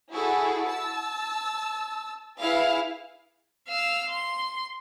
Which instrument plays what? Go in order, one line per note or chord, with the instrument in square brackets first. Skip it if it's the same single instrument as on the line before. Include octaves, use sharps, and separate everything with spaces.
[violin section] E4 F#4 G#4 A4
A5 E6
E4 G#4 B4 F5
[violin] F5 E6
C6